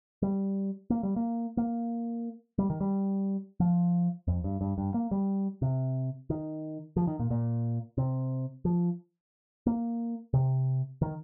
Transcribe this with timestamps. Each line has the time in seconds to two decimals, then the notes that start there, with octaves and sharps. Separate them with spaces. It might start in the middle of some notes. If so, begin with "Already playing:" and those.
0.22 G3
0.90 A#3
1.03 G3
1.16 A#3
1.57 A#3
2.58 G3
2.70 D#3
2.81 G3
3.60 F3
4.27 F2
4.44 G2
4.61 G2
4.78 G2
4.94 A#3
5.11 G3
5.62 C3
6.30 D#3
6.96 F3
7.07 D#3
7.19 A#2
7.30 A#2
7.98 C3
8.65 F3
9.66 A#3
10.33 C3
11.02 D#3